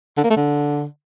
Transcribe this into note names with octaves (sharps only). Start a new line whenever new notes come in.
D3
A#3
A3
D3